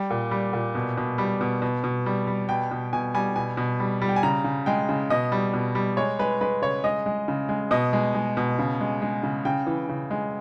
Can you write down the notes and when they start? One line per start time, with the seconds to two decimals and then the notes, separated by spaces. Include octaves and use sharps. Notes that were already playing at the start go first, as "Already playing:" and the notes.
Already playing: G3 G5
0.11 A#2
0.31 G3
0.53 A#2
0.75 B2
0.97 B2
1.18 G3
1.41 B2
1.62 B2
1.84 B2
2.06 G3
2.27 G3
2.49 B2 G5
2.71 B2
2.93 B2 G#5
3.14 G3 G#5
3.36 B2 G#5
3.57 B2
3.80 G3
4.02 G3
4.09 G5
4.16 G#5
4.23 C#3 A#5
4.44 C#3
4.66 G#3 G5
4.89 C#3
5.10 B2 D#5
5.32 G3
5.54 B2
5.75 G3
5.97 G#3 C#5
6.19 G#3 B4
6.41 G#3 B4
6.62 C#3 C#5
6.84 G#3 D#5
7.06 G#3
7.28 C#3
7.49 G#3
7.71 B2 D#5
7.93 G#3
8.15 G#3
8.37 B2
8.59 C#3
8.80 G#3
9.02 G#3
9.23 C#3
9.45 C#3 G5
9.66 E3
9.89 C#3
10.11 G#3